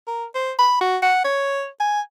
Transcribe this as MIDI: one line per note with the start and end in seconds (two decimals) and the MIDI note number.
0.07 0.25 70
0.35 0.52 72
0.59 0.76 83
0.81 0.97 66
1.03 1.22 78
1.24 1.67 73
1.80 2.01 80